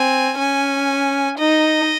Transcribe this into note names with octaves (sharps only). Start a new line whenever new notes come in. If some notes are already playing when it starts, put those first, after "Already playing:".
Already playing: C4 G#5
C#4 G#5
D#4 D#5